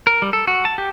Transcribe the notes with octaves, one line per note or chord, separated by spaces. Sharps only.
A#4
G3
A4
F#4
A5
G4